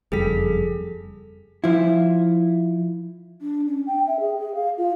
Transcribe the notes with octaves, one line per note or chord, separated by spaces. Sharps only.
F#1 F2 G3 G#4 A4 B6
F3 E4
D4
C#4
G5
E5
G#4
G#4
F5
F4